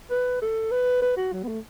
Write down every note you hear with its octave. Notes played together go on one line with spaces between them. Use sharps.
B4
A4
B4
B4
F#4
F#3
B3
A3